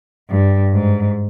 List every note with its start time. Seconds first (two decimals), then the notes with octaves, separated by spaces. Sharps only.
0.29 G2
0.73 G#2